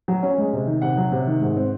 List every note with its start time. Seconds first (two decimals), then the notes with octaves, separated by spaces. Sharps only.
0.08 F#3
0.23 C#4
0.38 G#3
0.53 C3
0.67 D#3
0.82 C3 F#5
0.97 F#3
1.12 C3
1.27 D#3
1.41 G#2
1.57 C4